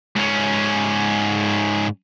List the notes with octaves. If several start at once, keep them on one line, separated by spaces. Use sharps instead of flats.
G#2 C#4